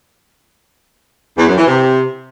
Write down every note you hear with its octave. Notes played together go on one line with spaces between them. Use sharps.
E2
F#2
E3
C3